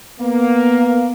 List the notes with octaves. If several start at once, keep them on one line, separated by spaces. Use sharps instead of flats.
A#3 B3